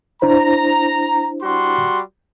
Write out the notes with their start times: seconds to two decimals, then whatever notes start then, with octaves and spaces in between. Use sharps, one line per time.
0.22 D4 E4 C5 A#5
1.42 G3 F#4 C6